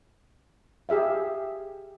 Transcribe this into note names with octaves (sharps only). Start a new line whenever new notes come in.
G4 G#4 E5 F5